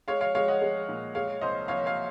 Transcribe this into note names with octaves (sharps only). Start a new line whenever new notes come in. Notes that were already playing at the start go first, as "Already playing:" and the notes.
G#3 C#5 F5
C#5 F5
G#3 C#5 F5
D#5 F#5
G#3
A#2
G#3 C#5 F5
C2 C5 D#5
C2 C#5 F5
C#5 F5